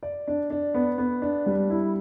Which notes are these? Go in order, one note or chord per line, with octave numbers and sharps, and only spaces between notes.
D5
D4
D4
B3
B3
D4
G3
E4